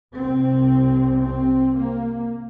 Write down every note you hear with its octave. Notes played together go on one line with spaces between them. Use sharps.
C2 C3 C4
C4
A#3